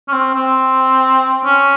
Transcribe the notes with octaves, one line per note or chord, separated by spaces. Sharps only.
C#4
C4
C4
C#4